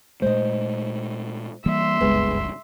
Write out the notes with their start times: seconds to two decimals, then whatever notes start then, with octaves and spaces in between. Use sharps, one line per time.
0.22 A#2 G#3 A3 C5 D#5
1.66 E3 G3 A#3 E5 C6
2.01 F#1 C#2 G2 G#3 B3 B4